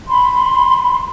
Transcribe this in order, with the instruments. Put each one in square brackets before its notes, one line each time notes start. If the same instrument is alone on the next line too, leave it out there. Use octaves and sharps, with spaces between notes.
[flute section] B5 C6